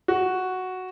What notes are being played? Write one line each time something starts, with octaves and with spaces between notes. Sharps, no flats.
F#4